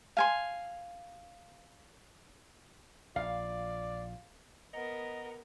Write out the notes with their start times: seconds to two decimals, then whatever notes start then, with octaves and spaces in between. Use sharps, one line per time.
0.17 F5 G#5 C6
3.16 A#1 F4 D5 F5
4.74 B3 A#4 D#5 F#5 A#5